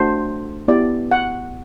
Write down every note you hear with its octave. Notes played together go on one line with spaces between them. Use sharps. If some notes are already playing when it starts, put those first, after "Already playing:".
Already playing: A3 D4 F#4 C5
B3 E4 G4 D5
F#5